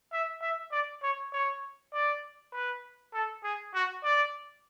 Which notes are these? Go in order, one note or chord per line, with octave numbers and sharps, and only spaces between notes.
E5
E5
D5
C#5
C#5
D5
B4
A4
G#4
F#4
D5